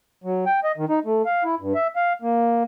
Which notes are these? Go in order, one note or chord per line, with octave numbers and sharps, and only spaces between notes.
F#3
G5
D#5
D#3
D#4
A3
F5
E4
G2
E5
F5
A#3